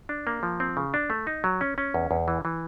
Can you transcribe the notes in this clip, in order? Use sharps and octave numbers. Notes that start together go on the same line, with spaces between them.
D4
A#3
F3
C4
C#3
D4
A3
D#4
F#3
C#4
C#4
E2
E2
E3
E3